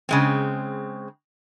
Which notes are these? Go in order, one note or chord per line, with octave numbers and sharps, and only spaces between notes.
C#3 G#3 C4